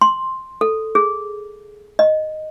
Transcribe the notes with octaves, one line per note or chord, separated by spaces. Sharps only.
C6
A4
G#4
D#5